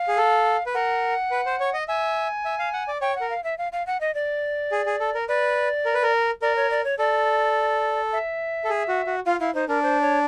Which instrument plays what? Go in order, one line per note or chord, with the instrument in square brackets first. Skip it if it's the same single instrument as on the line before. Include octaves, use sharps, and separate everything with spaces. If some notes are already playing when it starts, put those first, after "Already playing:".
Already playing: [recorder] F5
[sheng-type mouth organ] G#4
A4
B4
[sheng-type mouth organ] A#4 [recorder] F#5
[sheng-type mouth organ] B4
C5
C#5
D#5
[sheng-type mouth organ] E5 [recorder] G#5
[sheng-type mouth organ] E5
F5
F#5
D5
[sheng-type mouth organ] C#5 [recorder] G5
[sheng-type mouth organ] A#4 [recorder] F#5
[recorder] F5
E5
F5
F5
F#5
D#5
D5
[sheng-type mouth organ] G#4
G#4
A4
A#4
[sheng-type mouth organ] B4 [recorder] D5
[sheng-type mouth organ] A#4
B4
A#4
[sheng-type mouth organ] A#4 [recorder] D5
[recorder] C#5
D5
C#5
[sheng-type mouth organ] A4 [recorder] D5
[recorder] E5
[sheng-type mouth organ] A4
G#4
F#4
F#4
[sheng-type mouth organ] F4 [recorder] F5
[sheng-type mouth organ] E4 [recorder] F5
[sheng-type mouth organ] D#4 [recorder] C5
[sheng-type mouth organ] D4 [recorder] A#4
[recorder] C5
C#5